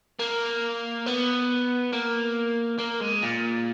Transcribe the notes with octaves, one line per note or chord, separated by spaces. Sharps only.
A#3
B3
A#3
A#3
G#3
A#2